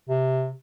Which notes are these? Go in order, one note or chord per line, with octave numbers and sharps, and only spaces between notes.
C3